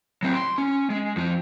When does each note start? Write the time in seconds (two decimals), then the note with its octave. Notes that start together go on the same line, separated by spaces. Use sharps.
0.23 F#3 C4
0.34 C6
0.58 C#4
0.90 G#3
1.16 F2 F3